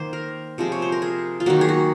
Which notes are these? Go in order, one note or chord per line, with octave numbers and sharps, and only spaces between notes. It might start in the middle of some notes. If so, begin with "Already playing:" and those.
Already playing: D#3 A#3 C5
A#4
C3 F3 G#3
C#5
C5
A#4
G#4
F4
D#3 F#3 A#3 F#4
G#4
F#4